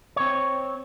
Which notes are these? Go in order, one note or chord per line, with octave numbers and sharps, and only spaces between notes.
C4 C#5